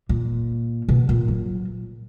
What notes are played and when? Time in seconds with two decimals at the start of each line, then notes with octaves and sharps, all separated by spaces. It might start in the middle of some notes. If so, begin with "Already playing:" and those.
0.09 A#2
0.89 B2
1.09 A#2
1.28 F#3